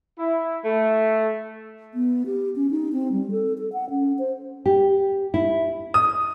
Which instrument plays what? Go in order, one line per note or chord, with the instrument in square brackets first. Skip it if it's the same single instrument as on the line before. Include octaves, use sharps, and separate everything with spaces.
[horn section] E4
A3
[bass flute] B3
G4
C#4
D#4
C4
G3
A4
A4
F#5
C#4
C5
[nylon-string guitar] G4
E4
[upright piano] D#6